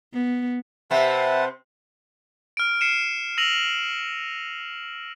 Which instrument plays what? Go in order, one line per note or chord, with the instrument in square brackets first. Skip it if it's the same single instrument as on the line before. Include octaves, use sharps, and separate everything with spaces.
[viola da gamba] B3
[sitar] C3 C4 [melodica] B4 F#5 A5 [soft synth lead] E5
[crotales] F6 D7
C7 C#7 D#7 E7
E6 A#6 D#7 F7 F#7